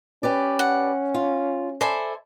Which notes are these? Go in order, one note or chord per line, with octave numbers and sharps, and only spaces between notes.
C#4 G4 B4 D5
F#5
F4
A4 C5 D5 E5 G#5 B5